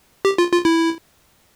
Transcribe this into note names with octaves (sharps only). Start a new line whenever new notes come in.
G4
F4
F4
E4